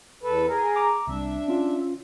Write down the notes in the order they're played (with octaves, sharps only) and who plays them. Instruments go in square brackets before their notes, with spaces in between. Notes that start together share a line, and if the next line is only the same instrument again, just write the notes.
[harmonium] E2 A4 B4
G#4 A#4
[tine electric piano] A#5 D6
[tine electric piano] C2 [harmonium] D4 E5
[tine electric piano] C#4 F4